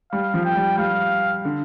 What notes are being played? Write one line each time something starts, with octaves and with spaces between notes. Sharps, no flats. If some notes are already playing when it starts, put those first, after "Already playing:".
G3 F5
F3
G5
G3
G3 F5
D3